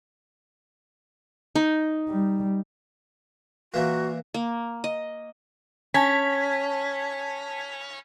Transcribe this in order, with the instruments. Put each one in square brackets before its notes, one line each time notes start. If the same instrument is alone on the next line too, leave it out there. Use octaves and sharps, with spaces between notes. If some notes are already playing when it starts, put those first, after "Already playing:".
[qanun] D#4
[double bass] G3
[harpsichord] A#2 E3 A#3 [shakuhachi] F#4
[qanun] A#3
D#5
[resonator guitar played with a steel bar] C#4 [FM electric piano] A5 G#6 B6